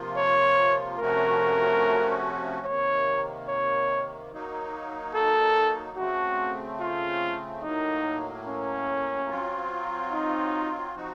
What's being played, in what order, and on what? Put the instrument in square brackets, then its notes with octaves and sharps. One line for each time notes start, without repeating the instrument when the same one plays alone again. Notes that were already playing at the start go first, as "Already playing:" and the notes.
Already playing: [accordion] C3 F3 A#3 F4
[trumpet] C#5
[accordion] C3 F3 A3 C#4 F#4 [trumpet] A#4
[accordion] C3 D#3 A#3 [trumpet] C#5
[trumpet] C#5
[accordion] F#3 A#3 D#4
[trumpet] A4
[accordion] C#3 A3 C4 [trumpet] F#4
[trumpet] F4
[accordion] A2 F#3 A#3 [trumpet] D#4
[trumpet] C#4
[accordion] F#3 C4 F4
[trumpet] D#4
[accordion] F3 C4 D#4 F#4